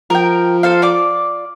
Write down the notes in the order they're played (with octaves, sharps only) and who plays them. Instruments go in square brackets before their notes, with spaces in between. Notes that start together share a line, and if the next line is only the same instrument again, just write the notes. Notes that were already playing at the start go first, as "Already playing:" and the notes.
[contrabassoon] F3 [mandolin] A#4 G5
[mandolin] A4 C5 F5
F4 D5 D6